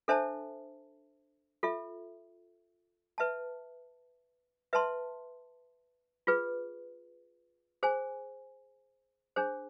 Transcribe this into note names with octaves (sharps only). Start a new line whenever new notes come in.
D4 A4 C5 E5 A5
F4 A4 E5
B4 E5 A5
B4 E5 A5 C6
F4 G#4 B4
G#4 C5 G#5
D4 G#4 C5